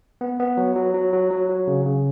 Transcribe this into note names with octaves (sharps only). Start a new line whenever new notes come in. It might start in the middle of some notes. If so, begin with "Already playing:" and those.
B3
B3
F#3
F#3
F#3
F#3
F#3
F#3
C#3
C#3